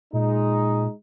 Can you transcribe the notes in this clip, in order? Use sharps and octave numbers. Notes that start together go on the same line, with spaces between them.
A#2 G#3 D#4